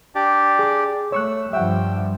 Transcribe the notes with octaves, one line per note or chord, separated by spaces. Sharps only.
D4 G4 D5
G#4 D6
A3 C#5 C#6 E6 F#6
G2 F3 G3 E5 F#5 G5 E6